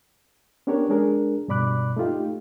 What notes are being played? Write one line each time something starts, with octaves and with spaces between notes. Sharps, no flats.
B3 C#4 D4 G4 A#4 C#5
G#3 D4 G#4 A#4
G2 B2 D5 B5 D6 F#6
A3 D#4 F4 G4